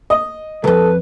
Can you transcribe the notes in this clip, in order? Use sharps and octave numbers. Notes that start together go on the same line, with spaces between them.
D#5
C2 F2 A4 B4